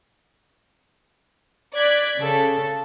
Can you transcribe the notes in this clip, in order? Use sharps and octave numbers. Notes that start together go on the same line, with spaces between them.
D5 F#6 G#6 B6
C#3 A4